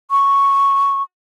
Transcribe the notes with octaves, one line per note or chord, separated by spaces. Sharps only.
C#6